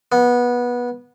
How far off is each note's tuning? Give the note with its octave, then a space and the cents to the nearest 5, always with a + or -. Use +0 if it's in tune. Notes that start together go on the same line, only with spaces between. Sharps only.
B3 -20